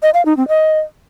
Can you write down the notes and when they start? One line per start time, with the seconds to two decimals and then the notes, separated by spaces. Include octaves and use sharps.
0.03 D#5
0.14 F5
0.25 D#4
0.37 C4
0.48 D#5